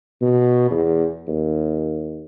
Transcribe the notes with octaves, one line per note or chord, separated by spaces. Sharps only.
B2
E2
D#2